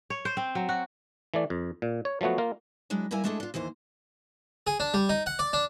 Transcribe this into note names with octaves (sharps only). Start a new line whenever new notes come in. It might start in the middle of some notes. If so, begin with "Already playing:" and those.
C#5
C5
C4
F#3
F#4
E3 A3 D5
F2
A#2
C#5
F3 F#3 A3 B3 F#4
A#3 F4 A#4
F#3 G#3 D4 E4
G3 A#3 E4 A#4 E5 G#5
G#3 A3 D4 E4 G#4 A4
D4 F4
D#2 E3 A#3 C5
G#4
D4
G3
D#4
F#5
D5
D4